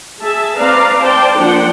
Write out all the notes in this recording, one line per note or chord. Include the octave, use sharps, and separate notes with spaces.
G#4 E5 A5
C4 B4 D5 F5 A#5
C5 D5 G5 A5
F3 A#3 D4 F#5 G5